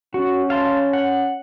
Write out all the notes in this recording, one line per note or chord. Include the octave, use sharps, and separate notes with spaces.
C#4 F#4
F5 A5 C6
F#5